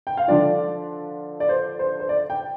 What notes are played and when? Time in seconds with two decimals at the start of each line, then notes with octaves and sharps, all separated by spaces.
0.07 G5
0.17 F5
0.28 D3 F3 D4 F4 D5
1.40 D5
1.49 C5
1.79 C5
2.00 C5
2.09 D5
2.30 G5